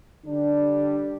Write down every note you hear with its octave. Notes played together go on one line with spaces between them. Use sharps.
D3 G3 D4